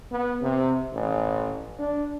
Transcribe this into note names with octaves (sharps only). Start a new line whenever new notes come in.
B3
C3
A1
D4